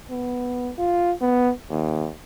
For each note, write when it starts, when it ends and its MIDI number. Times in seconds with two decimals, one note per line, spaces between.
0.11 0.71 59
0.78 1.12 65
1.21 1.51 59
1.70 2.08 39